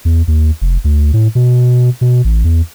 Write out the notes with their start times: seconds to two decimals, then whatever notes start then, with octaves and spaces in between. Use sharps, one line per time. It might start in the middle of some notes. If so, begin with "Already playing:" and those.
0.05 E2
0.28 D#2
0.62 F1
0.84 D2
1.13 A2
1.35 B2
2.01 B2
2.25 A1
2.44 E2